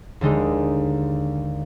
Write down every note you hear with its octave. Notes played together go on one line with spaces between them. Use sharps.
D#2 D3 G#3 D#4